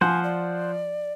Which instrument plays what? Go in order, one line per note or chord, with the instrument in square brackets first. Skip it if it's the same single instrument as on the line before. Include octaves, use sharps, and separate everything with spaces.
[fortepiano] F3 [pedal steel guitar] C5 F#5 [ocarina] G#5
[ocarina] D5